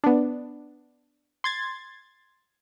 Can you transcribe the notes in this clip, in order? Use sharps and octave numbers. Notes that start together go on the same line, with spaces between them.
B3 D4
C6 G#6 A6